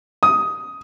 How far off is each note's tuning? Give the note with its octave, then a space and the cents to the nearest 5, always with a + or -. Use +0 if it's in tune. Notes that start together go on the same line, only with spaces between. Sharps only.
D#6 +10